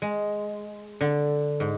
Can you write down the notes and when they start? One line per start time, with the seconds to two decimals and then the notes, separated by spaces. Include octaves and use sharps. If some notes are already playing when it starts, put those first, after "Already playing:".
0.02 G#3
1.01 D3
1.60 G#2